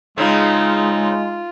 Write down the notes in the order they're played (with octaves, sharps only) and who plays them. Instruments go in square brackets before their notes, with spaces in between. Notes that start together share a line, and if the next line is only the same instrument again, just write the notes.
[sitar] C#3 C4 [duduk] G#3 [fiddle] D#4 [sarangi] F4